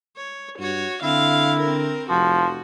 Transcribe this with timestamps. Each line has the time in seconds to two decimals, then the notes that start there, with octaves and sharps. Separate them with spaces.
0.17 C#5
0.59 G2 F#4 C#5
1.03 D3 C4 E4 F5
1.61 C4 A#4
2.10 F1 F3 F#4